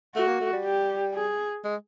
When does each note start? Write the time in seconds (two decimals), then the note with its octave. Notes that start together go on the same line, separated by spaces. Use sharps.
0.15 A3 F#4
0.28 A#3
0.40 A3
0.53 G3
0.65 G4
1.14 G#4
1.64 G#3